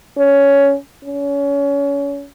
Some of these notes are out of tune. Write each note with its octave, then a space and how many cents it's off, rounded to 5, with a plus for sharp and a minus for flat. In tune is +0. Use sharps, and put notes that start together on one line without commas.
C#4 +10
C#4 +30